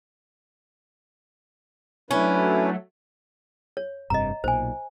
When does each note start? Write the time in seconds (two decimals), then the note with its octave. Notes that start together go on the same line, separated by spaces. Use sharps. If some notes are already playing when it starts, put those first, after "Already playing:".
2.11 F#3 A3 C#4 D4 E4 B4
3.77 C#5
4.10 F1 G2 C3 D#5 A#5
4.44 B1 A#2 C5 G#5